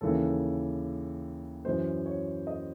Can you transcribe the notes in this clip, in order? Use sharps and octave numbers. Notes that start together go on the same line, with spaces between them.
D#2 C#3 E3 A4
F#2 E3 C5
C#5
D#5